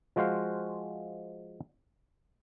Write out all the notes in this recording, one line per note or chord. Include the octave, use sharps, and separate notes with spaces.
F3 G#3 F#4 C5 F5